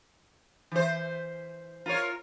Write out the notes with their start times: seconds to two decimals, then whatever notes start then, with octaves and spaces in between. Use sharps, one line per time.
0.72 E3 C5
1.86 F4 A#4 C#5